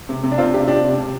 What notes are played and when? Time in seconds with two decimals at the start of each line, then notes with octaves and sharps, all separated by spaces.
0.09 C3
0.23 C3
0.31 D4
0.38 C3 C4 F4
0.54 C3 D4 G4
0.68 C3 D4 G4
0.84 C3
0.98 C3